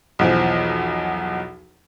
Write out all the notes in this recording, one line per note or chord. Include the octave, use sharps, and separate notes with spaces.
B1 E2 F3